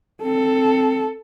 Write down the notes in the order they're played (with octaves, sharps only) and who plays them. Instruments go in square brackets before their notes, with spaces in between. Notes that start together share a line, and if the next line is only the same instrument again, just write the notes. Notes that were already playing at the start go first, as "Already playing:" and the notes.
[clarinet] C4 [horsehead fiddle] A4